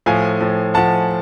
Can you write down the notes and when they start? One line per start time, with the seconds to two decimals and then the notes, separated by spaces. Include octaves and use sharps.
0.06 A2 F3 F5 G#5
0.41 A2 F3
0.74 A2 F3 F#5 A5